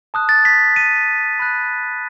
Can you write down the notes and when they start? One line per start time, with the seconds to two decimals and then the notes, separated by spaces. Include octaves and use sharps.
0.14 A5 D#6 F#6
0.29 A6
0.45 B6
0.76 D#7
1.39 B5 F#6